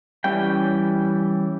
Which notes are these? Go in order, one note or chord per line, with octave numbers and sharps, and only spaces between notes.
E3 G3 C#4 G5